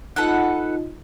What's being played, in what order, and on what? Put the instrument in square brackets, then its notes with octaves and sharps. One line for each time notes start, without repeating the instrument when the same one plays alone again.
[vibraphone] D#4 F4 D#5 [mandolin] A4 B4 F#5